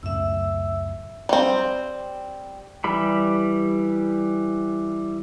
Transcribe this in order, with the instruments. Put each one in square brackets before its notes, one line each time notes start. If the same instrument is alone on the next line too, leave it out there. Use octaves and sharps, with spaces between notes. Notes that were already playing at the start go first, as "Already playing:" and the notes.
[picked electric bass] C#2 F#2 A2 [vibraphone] E5 E6
[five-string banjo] G3 C4
[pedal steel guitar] E3 G3 B5